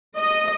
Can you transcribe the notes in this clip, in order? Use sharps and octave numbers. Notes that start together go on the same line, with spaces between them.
D#5